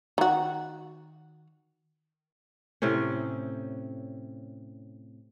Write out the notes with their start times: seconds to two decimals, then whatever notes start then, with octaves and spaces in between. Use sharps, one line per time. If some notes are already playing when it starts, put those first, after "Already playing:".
0.18 D#3 F#4
2.82 A2 C3 C4 C#4